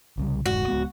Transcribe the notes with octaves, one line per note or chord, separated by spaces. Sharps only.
C2 C#3 G3
F1 G#2 F#4
C#2 G#3 B3